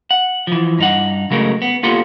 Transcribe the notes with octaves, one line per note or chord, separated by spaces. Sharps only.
F#5
E3 F3
G2 D#4 F#5
C#3 F#3 G#3 A3 A#4
B3
A#3 B3 F4 G4 A4